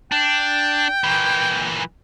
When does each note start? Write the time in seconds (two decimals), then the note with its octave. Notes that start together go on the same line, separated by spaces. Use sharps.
0.12 D4 G5
1.04 A#2 E3